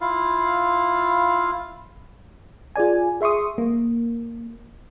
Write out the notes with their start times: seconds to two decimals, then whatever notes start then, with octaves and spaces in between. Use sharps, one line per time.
0.01 E4 F4 F5
2.76 F4 G#4 D5 G#5
3.21 G#4 E5 C6 C#6 D#6
3.58 A#3